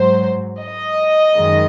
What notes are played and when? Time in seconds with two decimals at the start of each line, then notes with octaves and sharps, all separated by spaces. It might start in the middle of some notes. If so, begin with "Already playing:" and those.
Already playing: G#2 F#3 C5
0.61 D#5
1.34 F#2 D#3 G#3